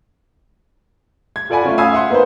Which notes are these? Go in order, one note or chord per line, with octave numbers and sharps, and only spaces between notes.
G#6
F4 A4 D5 F#5 G#5 B5
A3 C#4 F4
F5 G#5 B5 D#6 E6 G#6
E5 F#5 C6
A#3 B3 D#4 B4 C5